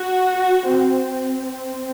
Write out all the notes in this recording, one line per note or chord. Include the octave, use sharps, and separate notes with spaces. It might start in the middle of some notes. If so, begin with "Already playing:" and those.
Already playing: F#4
C4
C4